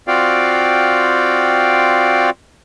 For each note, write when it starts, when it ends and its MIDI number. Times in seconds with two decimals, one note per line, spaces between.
0.08 2.30 60
0.08 2.30 65
0.08 2.30 66
0.08 2.30 74
0.08 2.30 77
0.08 2.30 79